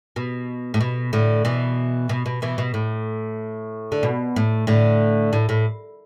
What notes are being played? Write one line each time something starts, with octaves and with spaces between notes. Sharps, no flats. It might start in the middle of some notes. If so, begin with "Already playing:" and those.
B2
A2
B2
A2 D3
B2 E3
B2
B2
B2 E3
B2
A2
D3
B2
A2
A2 D3
A2
A2